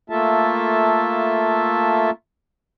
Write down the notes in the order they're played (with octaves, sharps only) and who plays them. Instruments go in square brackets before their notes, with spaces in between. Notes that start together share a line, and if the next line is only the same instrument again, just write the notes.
[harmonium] A3 A#3 F4 A4 E5 A5